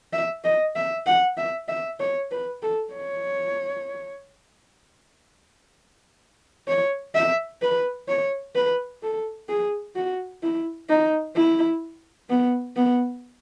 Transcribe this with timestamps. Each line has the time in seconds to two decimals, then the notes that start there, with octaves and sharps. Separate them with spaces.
0.13 E5
0.44 D#5
0.75 E5
1.06 F#5
1.37 E5
1.68 E5
2.00 C#5
2.31 B4
2.62 A4
2.93 C#5
6.68 C#5
7.15 E5
7.62 B4
8.08 C#5
8.55 B4
9.03 A4
9.49 G#4
9.96 F#4
10.43 E4
10.89 D#4
11.36 E4
12.30 B3
12.76 B3